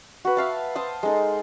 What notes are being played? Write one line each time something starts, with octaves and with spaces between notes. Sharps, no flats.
F#4 B4
E5 F5 A5
C5 A5 D#6
G#3 D#4 A4